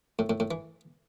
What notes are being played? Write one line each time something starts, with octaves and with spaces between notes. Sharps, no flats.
A2
A2
A2
E3